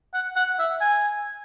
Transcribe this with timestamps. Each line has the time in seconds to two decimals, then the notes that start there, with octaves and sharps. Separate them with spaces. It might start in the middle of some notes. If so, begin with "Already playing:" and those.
0.14 F#5
0.36 F#5
0.59 E5
0.81 G#5